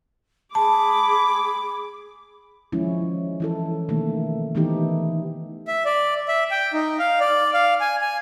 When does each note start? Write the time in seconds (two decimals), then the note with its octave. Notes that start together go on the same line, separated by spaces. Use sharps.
0.55 G#4 A5 B5 D6
2.72 D#3 F3 G#3 C#4 E4
3.40 E3 E4 A4
3.89 B2 D#3 A3 A#3
4.55 D#3 E3 A3 B3 D#4 G4
5.68 E5
5.85 D5
6.28 E5
6.51 G5
6.73 D#4
6.99 F5
7.20 D5
7.54 F5
7.80 G#5
8.01 G#5